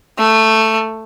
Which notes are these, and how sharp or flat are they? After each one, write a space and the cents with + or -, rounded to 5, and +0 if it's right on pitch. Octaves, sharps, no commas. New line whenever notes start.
A3 +10